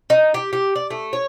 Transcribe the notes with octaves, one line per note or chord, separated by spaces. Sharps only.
D#4
G4
G4
D5
A3
C#5